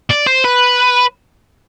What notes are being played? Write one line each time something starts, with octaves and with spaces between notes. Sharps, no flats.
D5
C5
B4